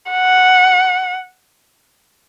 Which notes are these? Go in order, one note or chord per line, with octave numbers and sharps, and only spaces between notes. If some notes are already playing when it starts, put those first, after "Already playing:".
F#5